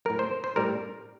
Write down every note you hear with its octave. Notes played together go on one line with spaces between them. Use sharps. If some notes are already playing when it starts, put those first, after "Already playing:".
A2 F#3 A#4
C5
C5
A2 G3 A#4